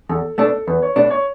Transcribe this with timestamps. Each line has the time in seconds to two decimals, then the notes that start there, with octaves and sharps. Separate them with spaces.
0.09 E2 A4
0.38 B2 A3 D4 A4
0.67 E2 B4
0.82 C#5
0.96 B2 A3 D4 D5
1.10 C#5